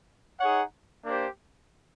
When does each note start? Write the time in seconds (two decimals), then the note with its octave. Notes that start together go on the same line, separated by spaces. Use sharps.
0.40 D#4 G#4 C#5 F#5
1.05 A#3 D4 G4 C5